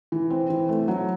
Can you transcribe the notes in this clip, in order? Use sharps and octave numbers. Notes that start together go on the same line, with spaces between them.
E3
C4
E3
A3
F#3